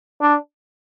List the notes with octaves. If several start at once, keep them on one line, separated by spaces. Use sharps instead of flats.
D4